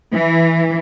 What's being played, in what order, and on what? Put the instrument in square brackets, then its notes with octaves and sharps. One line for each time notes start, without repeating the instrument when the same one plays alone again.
[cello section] E3